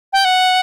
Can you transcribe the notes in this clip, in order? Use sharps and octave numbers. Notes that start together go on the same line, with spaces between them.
G5
F#5